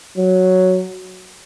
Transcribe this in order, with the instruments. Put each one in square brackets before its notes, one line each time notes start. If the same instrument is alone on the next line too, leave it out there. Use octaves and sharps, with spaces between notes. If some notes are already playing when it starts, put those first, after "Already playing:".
[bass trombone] F#3